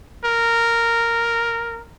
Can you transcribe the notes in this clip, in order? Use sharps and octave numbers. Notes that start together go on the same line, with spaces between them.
A#4